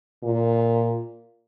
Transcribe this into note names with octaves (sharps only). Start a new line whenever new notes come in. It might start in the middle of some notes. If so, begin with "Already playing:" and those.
A#2